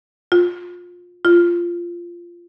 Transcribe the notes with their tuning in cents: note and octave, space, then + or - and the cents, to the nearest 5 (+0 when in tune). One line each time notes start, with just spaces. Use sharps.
F4 +20
F4 -10